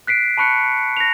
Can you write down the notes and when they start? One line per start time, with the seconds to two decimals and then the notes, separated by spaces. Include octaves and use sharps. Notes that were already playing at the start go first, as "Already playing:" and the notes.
0.07 F#6 B6 C7 D7
0.37 A5 B5 C#6 F#6 C#7
0.97 A#6 F7